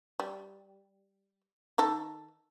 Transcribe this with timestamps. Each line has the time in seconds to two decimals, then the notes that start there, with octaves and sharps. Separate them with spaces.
0.20 G3
1.78 D#3 D#4 A4